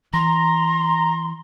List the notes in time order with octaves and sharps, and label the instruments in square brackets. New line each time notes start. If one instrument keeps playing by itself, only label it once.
[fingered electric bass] E3 [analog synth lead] A#5 [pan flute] C6